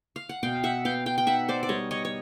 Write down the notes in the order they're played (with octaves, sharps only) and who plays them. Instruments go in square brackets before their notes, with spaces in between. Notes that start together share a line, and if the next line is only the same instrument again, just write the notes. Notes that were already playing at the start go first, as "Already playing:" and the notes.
[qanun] F5
F#5
[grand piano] B2 [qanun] F5 G5
[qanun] E5 F#5
[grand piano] B3 [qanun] F5 G5
[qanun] F5 G5
G5
[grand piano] D#4 [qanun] E5 F#5
[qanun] C5 D5
D5
[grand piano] G3 [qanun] C#5 D#5
[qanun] C#5 D#5
C#5